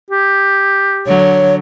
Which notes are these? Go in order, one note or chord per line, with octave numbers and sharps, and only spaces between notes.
G4
D3 F#3 C#5